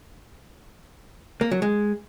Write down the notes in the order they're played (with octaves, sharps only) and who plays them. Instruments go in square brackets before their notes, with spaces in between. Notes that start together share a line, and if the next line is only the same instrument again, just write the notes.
[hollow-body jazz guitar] A#3
F#3
G#3